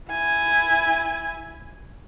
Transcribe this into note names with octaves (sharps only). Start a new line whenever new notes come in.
E4 G#5